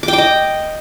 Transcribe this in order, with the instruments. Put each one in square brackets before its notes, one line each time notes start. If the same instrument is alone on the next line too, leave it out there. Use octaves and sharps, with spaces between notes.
[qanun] D6
G5
D6
D#5